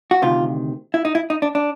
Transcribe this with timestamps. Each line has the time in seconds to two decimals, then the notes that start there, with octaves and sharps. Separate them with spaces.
0.11 F#4
0.22 D2 C3 D#3 F4
0.94 E4
1.05 D#4
1.15 E4
1.30 D#4
1.42 D4
1.55 D4